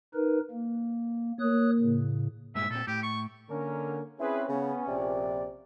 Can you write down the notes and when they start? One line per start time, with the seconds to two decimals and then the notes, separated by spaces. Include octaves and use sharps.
0.15 D#4 A#4 B4
0.51 A#3
1.39 A#3 C#5 D#6 F#6
1.80 A2 C#3
2.55 G2 A#2 G#3 E5
2.70 A#2 C4 A4
2.87 A2 G4
3.03 C#6
3.50 D3 A#3 C#4 A#4
4.20 C4 C#4 E4 G#4 B4
4.49 C#3 B3
4.87 A#1 C3 D5